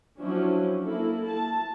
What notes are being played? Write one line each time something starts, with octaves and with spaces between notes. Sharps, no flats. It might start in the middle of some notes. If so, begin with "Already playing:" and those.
F3 F#3 C#4 D4 E4
A#3 E4 A4
A5